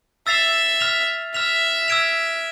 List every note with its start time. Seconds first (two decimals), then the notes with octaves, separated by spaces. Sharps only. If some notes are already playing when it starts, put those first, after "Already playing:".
0.27 E5 E6 A6 C7 F7
0.80 F6 B6 F7
1.34 E5 F6 B6 F7
1.88 E6 G#6 D7 F7